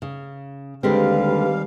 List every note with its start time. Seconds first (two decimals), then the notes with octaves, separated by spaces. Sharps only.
0.02 C#3
0.83 D#2 D3 G3 G#3 C4 G4 B4 F5